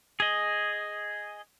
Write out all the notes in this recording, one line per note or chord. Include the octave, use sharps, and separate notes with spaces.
G#4 D#5